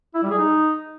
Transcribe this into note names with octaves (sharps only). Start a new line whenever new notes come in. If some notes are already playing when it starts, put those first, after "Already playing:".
E4
G3
G#4
D#4